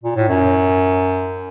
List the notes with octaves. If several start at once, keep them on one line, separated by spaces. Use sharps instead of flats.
A#2
A2
F#2